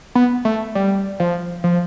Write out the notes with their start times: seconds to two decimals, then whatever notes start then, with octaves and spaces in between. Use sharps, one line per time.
0.15 B3
0.45 A3
0.75 G3
1.20 F3
1.64 F3